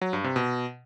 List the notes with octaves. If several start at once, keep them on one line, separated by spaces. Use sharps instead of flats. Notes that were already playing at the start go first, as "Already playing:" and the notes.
F#3
G2
C3
B2